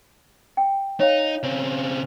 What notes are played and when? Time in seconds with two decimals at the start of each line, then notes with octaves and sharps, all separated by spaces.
0.57 G5
1.00 D#4 C#5 F5
1.43 C#3 C4